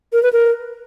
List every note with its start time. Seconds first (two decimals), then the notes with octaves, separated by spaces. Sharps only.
0.13 A#4
0.23 B4
0.33 A#4